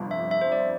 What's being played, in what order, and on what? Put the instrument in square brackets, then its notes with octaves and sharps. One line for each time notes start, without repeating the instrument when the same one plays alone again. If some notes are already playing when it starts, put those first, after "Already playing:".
Already playing: [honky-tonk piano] G1 F2 C3
[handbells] E5
E5
C5
D5